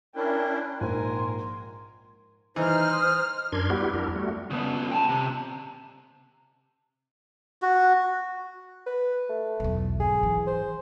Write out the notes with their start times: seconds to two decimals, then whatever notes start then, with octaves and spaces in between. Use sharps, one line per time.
0.16 C#4 D4 E4 A#4 G5
0.81 A#1 G#2 A#4 G#5 C6
2.56 E3 D#4 C5 F6
2.93 D#6
3.52 F#2 D4 A#4 C6 G#6
3.70 G3 B3 E4 F#4 G4
3.93 F2 D4 E4 A#4
4.16 G3 A3 F#4
4.50 C#3 B3
4.91 G5 A5
5.09 C3
7.62 F#4
8.86 B4
9.29 A3
9.60 B1 E2
10.00 G#1 G#4
10.23 E3
10.47 C5